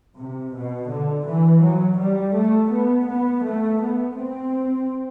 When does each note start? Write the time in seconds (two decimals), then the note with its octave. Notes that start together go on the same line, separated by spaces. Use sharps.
0.17 C3
0.53 B2
0.89 D3
1.26 E3
1.63 F#3
1.99 G3
2.35 A3
2.72 B3
3.07 B3
3.44 A3
3.81 B3
4.17 C4